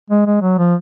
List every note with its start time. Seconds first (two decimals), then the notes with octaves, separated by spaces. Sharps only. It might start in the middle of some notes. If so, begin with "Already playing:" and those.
0.10 G#3
0.26 G#3
0.41 F#3
0.58 F3